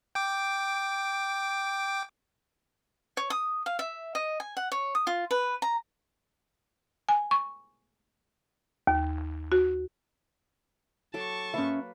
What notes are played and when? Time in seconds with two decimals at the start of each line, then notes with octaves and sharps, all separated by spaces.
0.15 G5 D6
3.17 C#5
3.30 D#6
3.66 F5
3.79 E5
4.15 D#5
4.40 G#5
4.57 F#5
4.72 C#5
4.95 D#6
5.07 F4
5.31 B4
5.62 A#5
7.09 G#5
7.31 C#6
8.87 D#2
9.52 F#4
11.14 F#3 A4 A5 C#6 D6
11.54 A#3 C#4 B4 E5